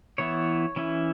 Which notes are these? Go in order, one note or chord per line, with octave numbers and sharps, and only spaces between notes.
E3 B3 E4 C#5
E3 C#4 E4